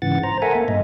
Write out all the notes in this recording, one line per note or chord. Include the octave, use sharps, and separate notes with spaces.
G#2 C#3 E3 F#5 A6
C5 A#5
A4 A#4 E5 F#5 G#5
A#3
G2 A#2 D#5